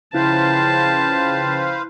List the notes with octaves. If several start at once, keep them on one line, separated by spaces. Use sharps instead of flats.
C#3 F3 E4 B4 C5 F5 G5 A5